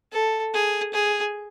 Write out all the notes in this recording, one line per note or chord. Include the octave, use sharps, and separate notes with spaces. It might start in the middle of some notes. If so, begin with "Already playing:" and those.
A4
G#4
G#4